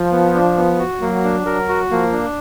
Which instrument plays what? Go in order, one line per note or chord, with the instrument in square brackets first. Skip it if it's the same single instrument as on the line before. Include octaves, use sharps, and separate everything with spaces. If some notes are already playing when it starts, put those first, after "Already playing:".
Already playing: [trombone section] F3
[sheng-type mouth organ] B3
D4
B3
F#4
[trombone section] F#3 [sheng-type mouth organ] A#3
[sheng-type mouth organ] D4
[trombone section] F#3 [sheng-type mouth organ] A#4
[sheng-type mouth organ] F#4
[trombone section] F3 [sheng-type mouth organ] A#3
[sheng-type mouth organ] D4